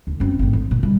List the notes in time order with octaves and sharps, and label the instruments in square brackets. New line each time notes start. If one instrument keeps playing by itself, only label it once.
[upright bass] D2
F#2 C4
G#1 A2
D3
A#2
D#3 G3